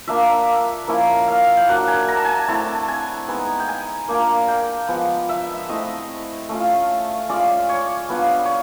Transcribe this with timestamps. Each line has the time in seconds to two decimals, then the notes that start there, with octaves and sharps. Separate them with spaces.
0.07 A#3 D4 F4 E5
0.87 F3 A#3 C#4 E4
1.28 F5
1.57 G5
1.68 F#3 A#3 D4 F#5
1.87 G#5
2.08 A#5
2.16 A5
2.25 G#5
2.33 A5
2.48 A3 C4 E4 A5
2.88 G#5
3.28 G#3 B3 D#4
3.60 G5
3.68 G#5
4.08 A#3 D4 F4
4.48 G5
4.88 F3 G#3 B3
5.29 E5
5.69 A3 C4 E4 D#5
6.49 A3 C#4 F4
7.29 G#3 C#4 F4 D5
7.69 C#5
8.09 G3 B3 D4 F4
8.45 C#5